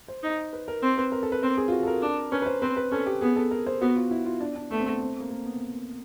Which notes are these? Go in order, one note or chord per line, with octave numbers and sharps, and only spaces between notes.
C5
D#4
B4
A#4
C4
B4
A#4
A4
B4
C4 A#4
G#4
F4
F#4
A4
A#4
D4
C#4 B4
B4
C5
C4 B4
B4
C#4 A4
G4
B3 G#4
A4
A#4
C5
B3 F#4
F4
E4
F4
D4
D4
A3 B3
C4
B3
C4
A#3
A#3
B3